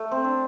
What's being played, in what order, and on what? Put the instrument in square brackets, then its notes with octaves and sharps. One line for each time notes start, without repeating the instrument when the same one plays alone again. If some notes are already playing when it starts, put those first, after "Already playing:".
Already playing: [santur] A3
C4
D4